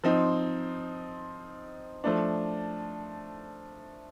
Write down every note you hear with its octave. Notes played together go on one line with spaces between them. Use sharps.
F3 C4 D#4
F3 A3 D4